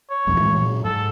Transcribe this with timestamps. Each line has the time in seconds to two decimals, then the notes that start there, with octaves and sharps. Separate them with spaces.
0.10 C#5
0.27 E1 B1 F2
0.40 A2 E3 G#3
0.57 A#2 F#3
0.85 G#2 A4